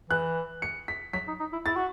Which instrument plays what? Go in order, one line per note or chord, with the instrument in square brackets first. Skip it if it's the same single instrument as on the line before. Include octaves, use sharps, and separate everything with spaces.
[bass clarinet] E3 [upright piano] F#6
[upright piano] C#7
B6
[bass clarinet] F#3 [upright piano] B6
[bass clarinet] D#4
D#4
E4
[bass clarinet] E4 [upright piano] A6
[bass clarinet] F#4